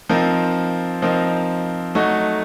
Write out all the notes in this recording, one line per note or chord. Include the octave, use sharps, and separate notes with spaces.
F3 C4 D#4 A#4
F3 C4 D#4 A#4
F#3 A3 D#4 F#4